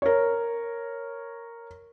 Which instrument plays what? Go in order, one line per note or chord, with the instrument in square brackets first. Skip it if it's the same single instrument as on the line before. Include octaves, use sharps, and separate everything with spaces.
[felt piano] A#4 C#5